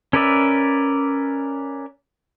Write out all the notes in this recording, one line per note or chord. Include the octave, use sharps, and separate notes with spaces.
C#4 A#4 B4 D5 E5